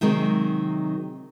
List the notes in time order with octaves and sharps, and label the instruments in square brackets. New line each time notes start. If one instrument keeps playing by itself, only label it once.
[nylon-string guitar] C3 D#3 F#3 G#3 C4